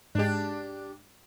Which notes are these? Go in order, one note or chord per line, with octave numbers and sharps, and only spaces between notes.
G#2 G#3 D4 G4